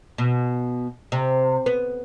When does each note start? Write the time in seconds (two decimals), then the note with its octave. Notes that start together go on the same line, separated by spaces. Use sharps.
0.18 B2
1.12 C3
1.66 B3